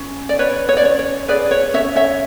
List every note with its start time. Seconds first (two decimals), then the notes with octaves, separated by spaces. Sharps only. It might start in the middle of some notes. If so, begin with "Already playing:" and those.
Already playing: C#4
0.29 D5
0.39 B4 C#5
0.69 C#5
0.77 D5
0.83 C#4 C#5
0.99 C#5
1.28 G#4 B4 D5
1.51 C#5
1.74 C#4 C#5 E5
1.96 C#5 E5